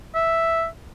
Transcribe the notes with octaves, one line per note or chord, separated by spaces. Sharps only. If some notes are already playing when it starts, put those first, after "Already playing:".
E5